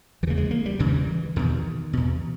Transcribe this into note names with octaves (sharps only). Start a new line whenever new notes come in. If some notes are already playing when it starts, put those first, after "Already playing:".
E2 C#3 E3 A#3
G#3
A#3
G3
E2 C#3 E3
G3
E3
E2 B2 D#3
E2 B2